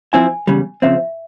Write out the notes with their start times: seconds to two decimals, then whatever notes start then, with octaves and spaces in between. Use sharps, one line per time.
0.13 F3 C4 E4 G#5
0.47 E2 C#3 G3
0.82 C#3 F3 C4 E5